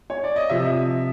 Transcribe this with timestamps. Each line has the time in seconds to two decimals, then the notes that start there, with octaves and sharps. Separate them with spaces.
0.10 C#5
0.24 D5
0.36 D#5
0.50 C3 F3 E5